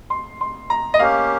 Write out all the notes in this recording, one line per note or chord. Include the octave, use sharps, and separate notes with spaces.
C6
C6
A#5
D#5
A#3 C#4 G4 F5